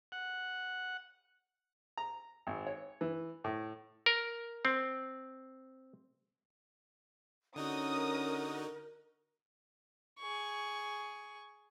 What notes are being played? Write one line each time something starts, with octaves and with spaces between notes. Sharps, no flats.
F#5
A#5
G#1
C#5
E3
A2
A#4
C4
D3 C#4 D#4 F#4 A#4 D#6
G#4 C#6